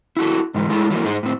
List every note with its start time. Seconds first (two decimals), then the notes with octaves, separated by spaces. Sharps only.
0.17 E4 F#4 A4
0.54 G#2 E3 G#3
0.69 G#3 A3 E4 G#4 A4
0.90 E3 F#3 G3 A3 A#3
1.05 G#2 D#4 G#4 C5
1.23 A2 C4